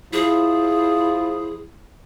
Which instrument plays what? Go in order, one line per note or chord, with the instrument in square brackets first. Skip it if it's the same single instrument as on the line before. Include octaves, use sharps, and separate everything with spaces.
[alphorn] F3 [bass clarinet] E4 [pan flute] G#4